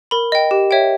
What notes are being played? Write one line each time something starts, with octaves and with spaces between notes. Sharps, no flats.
A#4 B5
D#5 G5
G4
C#5 E5 G5